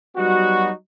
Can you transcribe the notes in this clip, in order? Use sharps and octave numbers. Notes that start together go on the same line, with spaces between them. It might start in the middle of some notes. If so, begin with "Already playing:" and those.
F#3 G3 B3 D#4 F#4